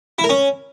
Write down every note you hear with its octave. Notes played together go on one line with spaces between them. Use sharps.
E4
A#4
C#4